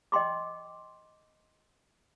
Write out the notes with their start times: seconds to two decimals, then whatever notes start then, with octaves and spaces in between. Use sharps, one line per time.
0.12 D#5 G5 C6 D6